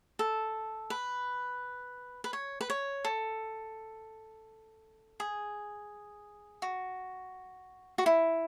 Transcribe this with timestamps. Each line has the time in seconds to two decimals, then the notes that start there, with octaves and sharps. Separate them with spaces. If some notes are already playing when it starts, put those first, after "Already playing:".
0.19 A4
0.90 B4
2.24 B4
2.33 C#5
2.61 B4
2.70 C#5
3.05 A4
5.20 G#4
6.62 F#4
7.98 F#4
8.06 E4